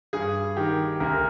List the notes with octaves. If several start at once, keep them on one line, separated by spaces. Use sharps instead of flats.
G2 G#4
D#3 G4
D2 A#4